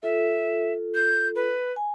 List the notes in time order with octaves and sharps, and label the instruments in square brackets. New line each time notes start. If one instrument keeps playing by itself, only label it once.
[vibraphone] F4 A4 [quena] E5
[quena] G6
B4
[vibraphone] G#5